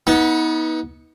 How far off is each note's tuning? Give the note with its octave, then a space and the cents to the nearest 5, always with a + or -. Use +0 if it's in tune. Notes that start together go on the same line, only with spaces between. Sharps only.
B3 -15 D#4 +35